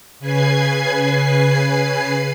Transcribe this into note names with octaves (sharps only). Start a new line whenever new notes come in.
C#3 B4 G#5 G#6 C7